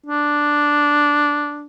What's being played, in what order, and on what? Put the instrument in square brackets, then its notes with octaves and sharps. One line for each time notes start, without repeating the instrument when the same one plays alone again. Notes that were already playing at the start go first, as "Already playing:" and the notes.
[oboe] D4